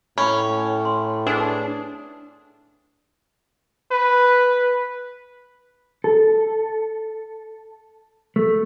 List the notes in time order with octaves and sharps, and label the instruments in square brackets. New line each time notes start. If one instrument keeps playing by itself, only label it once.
[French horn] A2 [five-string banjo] C#4 [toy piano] B5
[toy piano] C6
[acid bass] D4 [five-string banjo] G#4 [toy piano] B4
[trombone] B4
[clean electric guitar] A4
A3